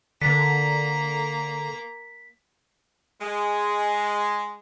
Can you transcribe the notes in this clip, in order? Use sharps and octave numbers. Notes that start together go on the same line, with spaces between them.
D3 A#3 A#5 B6
G#3